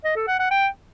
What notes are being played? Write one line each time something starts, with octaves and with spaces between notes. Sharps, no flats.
D#5
A4
F#5
F#5
G5